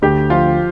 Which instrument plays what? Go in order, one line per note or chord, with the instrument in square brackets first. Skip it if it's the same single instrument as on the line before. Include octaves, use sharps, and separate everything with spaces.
[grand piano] D2 [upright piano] G4
[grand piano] F3 [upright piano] F4